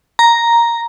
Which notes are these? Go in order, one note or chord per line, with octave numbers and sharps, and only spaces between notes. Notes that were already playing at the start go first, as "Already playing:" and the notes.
A#5